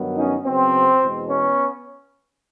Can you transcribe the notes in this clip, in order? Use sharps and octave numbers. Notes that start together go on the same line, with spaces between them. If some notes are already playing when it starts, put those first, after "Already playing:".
Already playing: G2 D#3 F#3 B3
C#4 D#4
C#3 F#3 B3 C4
E2 B2 G#3
B3 C#4